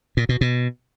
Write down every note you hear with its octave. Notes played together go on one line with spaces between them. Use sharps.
A#2
B2
B2